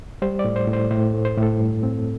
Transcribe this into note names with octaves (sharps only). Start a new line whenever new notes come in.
G3 C5
D5
A2
C5
A2
C5
A2 C5
A3
C5
A2
A4
G2
C4